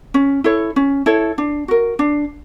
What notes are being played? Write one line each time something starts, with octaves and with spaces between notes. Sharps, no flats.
C#4
E4 A4 C#5
C#4
E4 A4 C#5
D4
F#4 A#4
D4